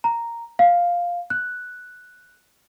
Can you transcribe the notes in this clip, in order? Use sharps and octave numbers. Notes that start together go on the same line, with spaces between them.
A#5
F5
F#6